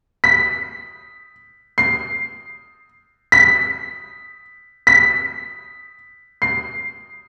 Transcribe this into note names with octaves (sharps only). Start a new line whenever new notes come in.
B6
C7
B6
B6
C7